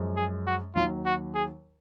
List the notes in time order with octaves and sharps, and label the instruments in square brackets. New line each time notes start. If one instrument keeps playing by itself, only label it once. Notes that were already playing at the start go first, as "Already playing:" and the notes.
Already playing: [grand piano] F#2 F3 G#3
[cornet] G#4
F#4
[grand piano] D#2 D#3 F#3 [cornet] F4
[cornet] F#4
G#4